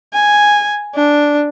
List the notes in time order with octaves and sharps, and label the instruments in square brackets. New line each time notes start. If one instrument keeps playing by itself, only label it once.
[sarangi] G#5
D4